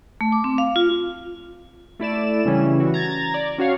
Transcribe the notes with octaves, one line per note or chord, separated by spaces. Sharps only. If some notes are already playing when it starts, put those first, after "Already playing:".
A3
D6
C4
F5
F4
A3 E4 D5 E7
C#3 E3 G3 C#4
E3 F#4
A#5 G#6 A6
D5
C#4 F#4 C#5 F5